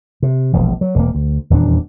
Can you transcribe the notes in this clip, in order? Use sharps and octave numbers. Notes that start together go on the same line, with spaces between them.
C3
E1 A#1 E2
F#3
E1 A#3
D2
D#1 E2 A#2 D4